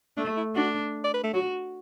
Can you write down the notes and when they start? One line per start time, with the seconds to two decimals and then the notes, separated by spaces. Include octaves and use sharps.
0.17 A3 D4
0.37 E4
0.56 D4 F#4
1.04 D5
1.14 B4
1.24 A3
1.33 F#3 F#4